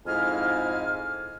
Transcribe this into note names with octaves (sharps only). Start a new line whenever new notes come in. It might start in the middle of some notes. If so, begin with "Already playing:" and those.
F2 G#2 E4 F5 G#5 F6